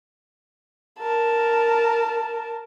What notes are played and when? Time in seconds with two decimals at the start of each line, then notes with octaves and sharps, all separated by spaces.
0.99 A#4 A5